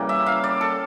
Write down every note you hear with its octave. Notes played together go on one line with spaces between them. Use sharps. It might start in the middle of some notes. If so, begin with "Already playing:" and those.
Already playing: C#3 E3 G3 A#3
E5
F5
D5
A4